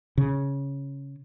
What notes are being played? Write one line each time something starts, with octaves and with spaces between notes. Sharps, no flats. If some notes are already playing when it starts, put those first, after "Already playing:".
C#3